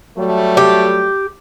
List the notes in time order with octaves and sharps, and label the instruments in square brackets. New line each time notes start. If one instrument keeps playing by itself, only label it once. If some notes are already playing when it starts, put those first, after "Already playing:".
[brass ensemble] F#3 G3 A3
[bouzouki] G4